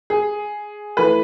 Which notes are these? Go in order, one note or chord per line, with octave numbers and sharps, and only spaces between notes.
G#4
E3 A3 B4